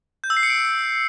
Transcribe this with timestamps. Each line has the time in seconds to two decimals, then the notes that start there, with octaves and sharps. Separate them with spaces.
0.24 G6
0.30 E6
0.37 C7
0.43 C#7
0.50 D7